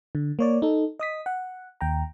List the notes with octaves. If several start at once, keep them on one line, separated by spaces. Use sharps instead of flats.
D3
A#3 C#5 D5
D#4 A4
D#5 D#6 B6
F#5
D#2 G5 A#5